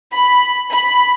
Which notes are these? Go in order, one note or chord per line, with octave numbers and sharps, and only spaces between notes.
B5
B5